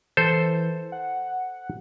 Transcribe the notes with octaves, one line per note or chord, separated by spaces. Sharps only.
E3 A4 C5
F#5